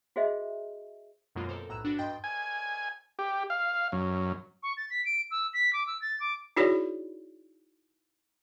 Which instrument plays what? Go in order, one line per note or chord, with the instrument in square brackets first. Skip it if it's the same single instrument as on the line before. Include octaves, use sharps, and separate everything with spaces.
[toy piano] F#4 G#4 C5 D#5 E5
[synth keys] F#2 B2 F#3 G#3 A#3 F4
C4 A4 A#4 C5
B1 A2 A#5 E6 F#6 E7
D4 F#4 B4
G2 D#5 G5 C6 G6 A6
[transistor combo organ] G#5
G4
F5
F#2
[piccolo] C#6
A6
B6
D7
E6
B6
D6
E6
A6
D6
[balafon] D#4 E4 F#4 G#4 C#5 D5